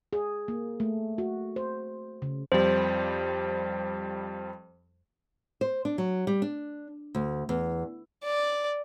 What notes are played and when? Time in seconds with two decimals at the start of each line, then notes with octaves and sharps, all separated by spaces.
0.13 G#4
0.48 A#3
0.80 A3
1.18 F#4
1.56 C5
2.22 C#3
2.52 F2 F3 G3 C5
5.61 C5
5.85 D4
5.98 F#3
6.27 G3
6.42 D4
7.15 D2
7.49 E2
8.24 D5